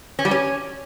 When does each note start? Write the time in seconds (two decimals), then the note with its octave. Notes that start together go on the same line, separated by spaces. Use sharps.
0.19 C#4
0.25 G3
0.31 C#4